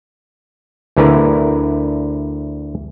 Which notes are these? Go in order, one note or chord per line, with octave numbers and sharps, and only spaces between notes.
D2 D3 E4 A#4 B4